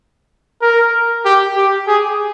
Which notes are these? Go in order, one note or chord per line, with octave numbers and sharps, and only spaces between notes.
A#4
G4
G4
G#4